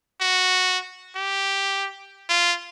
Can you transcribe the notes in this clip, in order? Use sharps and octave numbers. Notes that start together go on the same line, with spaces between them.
F#4
G4
F4